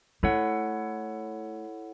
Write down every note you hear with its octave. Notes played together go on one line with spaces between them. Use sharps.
A3 E4 A4 C#5 F#5